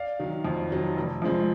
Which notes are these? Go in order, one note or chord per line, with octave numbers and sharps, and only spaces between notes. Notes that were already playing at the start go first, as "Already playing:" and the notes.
Already playing: D5 F5
D#3 F#3
F2
D#3 F#3
F1
F2 F3 G#3